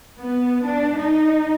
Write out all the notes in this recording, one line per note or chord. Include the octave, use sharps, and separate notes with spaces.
B3
D4
D#4